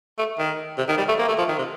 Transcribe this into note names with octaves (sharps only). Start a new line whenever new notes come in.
A3
D#3
C3
D#3
G3
A3
A#3
A3
F3
D#3
C3